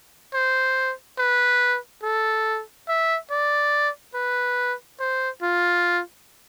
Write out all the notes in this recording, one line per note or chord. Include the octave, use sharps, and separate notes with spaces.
C5
B4
A4
E5
D5
B4
C5
F4